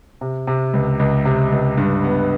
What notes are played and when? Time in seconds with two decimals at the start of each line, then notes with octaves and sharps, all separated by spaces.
0.21 C3
0.47 C3
0.74 C#2
0.99 C#2
1.25 C3
1.52 C#2
1.77 G2
2.04 B3